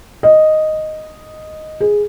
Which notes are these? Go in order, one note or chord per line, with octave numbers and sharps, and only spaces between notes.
D#5
G#4